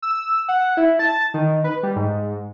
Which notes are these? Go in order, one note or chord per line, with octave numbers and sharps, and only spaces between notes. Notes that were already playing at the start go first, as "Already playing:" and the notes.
E6
F#5
E4
A5
D#3
B4
G3
G#2